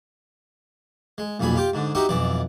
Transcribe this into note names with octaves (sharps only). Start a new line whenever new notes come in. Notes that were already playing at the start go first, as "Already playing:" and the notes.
G#3
B1 F2 A#2 G#4 B5
F4 G4 G5
G#2 D3
D#4 F#4 G4 D#5 E5
B1 F2 E3 D5